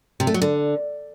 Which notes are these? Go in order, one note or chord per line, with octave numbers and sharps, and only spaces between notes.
C3
A3
F#3
D3